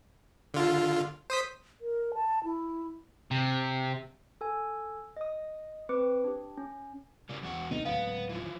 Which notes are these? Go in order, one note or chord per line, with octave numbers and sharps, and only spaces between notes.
D3 F4
C5 D#6 B6
A#4
A5
E4
C3
A4 G#5
D#5 D#6
C4 B4 D6 C#7
D4 G4
C#4
C#3 G3
E2 F#4
C2 D3 B3 D#4
D1 G#2 C#3 B3 F5
E3 F3